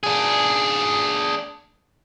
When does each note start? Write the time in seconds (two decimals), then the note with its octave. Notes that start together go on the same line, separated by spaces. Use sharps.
0.03 D4 G#4